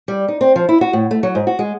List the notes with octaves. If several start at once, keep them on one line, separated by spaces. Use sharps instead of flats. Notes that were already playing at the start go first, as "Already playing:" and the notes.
G3
D#4
C4
F3
E4
F#4
A2
A3
F#3
G#2
F#4
G#3